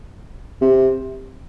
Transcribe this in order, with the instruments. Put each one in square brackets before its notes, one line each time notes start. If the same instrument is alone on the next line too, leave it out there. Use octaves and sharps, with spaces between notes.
[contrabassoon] C3